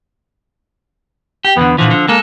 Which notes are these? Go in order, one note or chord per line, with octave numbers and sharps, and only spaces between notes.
G4
E2 D3 B3
A#2 D3 E3 F3
D3
G#3 A#3 A4